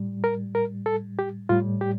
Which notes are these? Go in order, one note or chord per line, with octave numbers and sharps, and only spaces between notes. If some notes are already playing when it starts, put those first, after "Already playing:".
Already playing: A2 G3
A#4
A#4
A4
G4
A2 G3 F4
G4